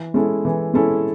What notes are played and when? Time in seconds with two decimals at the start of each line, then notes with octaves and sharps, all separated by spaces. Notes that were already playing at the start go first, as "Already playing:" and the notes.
Already playing: E3
0.14 G#3 C#4 E4 A4
0.45 E3
0.74 G#3 C#4 E4 A4